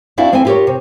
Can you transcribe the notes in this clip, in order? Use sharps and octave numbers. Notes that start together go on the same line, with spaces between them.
C4 D4 E4 F#4 D5 F5
F3 A3 C4 E4 F#5 G#5
E4 F4 G4 A4 A#4 C#5
C3